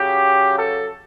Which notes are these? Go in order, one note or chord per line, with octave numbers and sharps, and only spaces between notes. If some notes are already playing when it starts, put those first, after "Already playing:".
Already playing: C#3 F#3 G4
A4